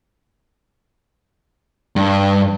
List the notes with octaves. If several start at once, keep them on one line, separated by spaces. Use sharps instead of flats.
G2